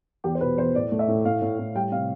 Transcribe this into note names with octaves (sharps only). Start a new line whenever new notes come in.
E2 G4
C5
B2 B4
E2 C5
A2 D5
A3
E5
A2
A2 F5
A2
A2
G3 G5
C3 F5